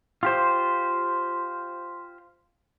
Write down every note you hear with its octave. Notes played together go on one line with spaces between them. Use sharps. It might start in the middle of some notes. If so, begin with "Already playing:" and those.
F4 G4 C5